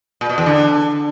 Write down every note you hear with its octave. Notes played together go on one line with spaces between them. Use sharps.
A#2
B2
E2
D3